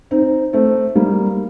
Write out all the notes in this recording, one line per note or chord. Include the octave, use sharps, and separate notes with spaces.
C4 D#4
A3 C4
G3 A#3